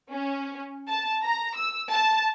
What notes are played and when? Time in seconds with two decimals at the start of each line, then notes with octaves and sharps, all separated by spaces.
0.11 C#4
0.88 A5
1.22 A#5
1.56 E6
1.90 A5